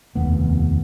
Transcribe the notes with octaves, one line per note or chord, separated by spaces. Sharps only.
F1 D#2 B3